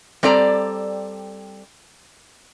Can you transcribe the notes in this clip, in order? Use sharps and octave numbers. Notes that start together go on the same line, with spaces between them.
G3 C4 A4 D5 A#5